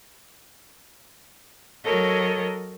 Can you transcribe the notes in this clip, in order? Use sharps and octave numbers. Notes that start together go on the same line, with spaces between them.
F#3 A4 A#4 C#5 D#5